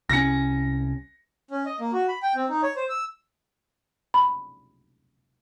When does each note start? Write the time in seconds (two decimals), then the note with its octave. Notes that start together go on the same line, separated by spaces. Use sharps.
0.09 C2 C#4 A#6 C#7
1.51 C#4
1.66 D#5
1.80 A#3
1.93 F#4
2.08 B5
2.23 G5
2.35 C4
2.49 D#4
2.63 C#5
2.76 C5
2.89 E6
4.14 B5